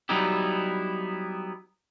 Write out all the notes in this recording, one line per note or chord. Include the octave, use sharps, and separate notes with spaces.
F#3 G3 B3 D#4 E4 G4